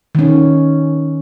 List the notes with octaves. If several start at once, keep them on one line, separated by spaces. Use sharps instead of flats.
D#3 C#4